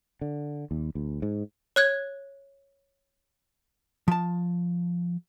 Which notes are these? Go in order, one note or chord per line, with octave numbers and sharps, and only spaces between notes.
D3
D#2
D2
G#2
C#5 F#6 G#6
F3 A5